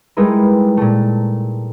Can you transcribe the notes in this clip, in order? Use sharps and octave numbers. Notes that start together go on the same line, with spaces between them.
G3 G#3 D#4 E4 A#4 B4
A#2 A3